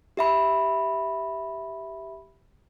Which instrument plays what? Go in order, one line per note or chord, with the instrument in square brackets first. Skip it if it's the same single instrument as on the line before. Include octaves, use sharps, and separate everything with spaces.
[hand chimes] G4 E5 B5